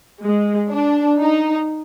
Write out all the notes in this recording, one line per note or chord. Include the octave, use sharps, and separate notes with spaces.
G#3
D4
D#4